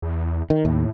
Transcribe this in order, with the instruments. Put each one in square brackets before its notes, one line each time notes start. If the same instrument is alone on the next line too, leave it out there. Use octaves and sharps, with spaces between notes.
[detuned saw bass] E2
[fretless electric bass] D#3
[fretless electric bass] D#2 [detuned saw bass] A2